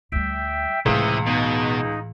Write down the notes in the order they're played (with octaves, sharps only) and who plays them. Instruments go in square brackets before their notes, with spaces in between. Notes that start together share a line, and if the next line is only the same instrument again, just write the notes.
[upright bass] D2 G3 [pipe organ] E5 G5
[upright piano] C#2 [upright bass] A2 E3 [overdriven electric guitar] C3 [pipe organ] E4 D#6
[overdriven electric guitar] B2 [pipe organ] D#4